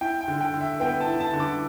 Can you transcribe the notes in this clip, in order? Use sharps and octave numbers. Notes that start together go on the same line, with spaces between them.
E4 G5
G5
D3
G5
D3
E5
B3 G5
A5
E4
A5
D3
D6